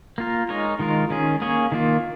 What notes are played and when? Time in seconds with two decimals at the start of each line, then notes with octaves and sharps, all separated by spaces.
0.18 A#3 F4 A#4
0.49 G#3 D#4 A#4 C#5
0.79 D#3 G#3 F4 A#4
1.10 D#3 C#4 G#4
1.42 A#3 C#4 G#4 C#5
1.72 D#3 A#3 F4